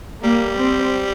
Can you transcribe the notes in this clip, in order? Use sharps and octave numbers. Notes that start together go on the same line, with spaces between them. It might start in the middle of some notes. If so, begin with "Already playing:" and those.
G3 A#3
C4